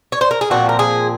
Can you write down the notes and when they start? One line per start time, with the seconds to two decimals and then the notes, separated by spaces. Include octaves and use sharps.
0.12 C#5
0.21 C5
0.31 A#4
0.41 G#4
0.50 A#2 F3 C4 F#4
0.69 A#4
0.79 G#4